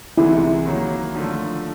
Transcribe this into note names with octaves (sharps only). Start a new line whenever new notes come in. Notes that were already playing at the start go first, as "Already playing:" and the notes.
C2 C3 E3 G#3 B3 E4
D#3 F#3 A#3
D3 F3 A3